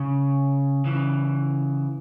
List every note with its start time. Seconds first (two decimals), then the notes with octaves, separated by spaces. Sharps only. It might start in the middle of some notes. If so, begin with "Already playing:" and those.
Already playing: C#3
0.85 C#3 E3